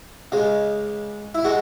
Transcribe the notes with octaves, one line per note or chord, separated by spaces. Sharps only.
C#2 C#3 G#3
E4
G#3 F#4